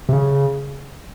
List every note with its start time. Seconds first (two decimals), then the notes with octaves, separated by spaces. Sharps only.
0.09 C3
0.13 C#3